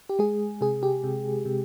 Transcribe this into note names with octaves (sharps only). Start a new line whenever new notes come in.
G4
G#3 G#4
C3 G#4
G4
C3
C3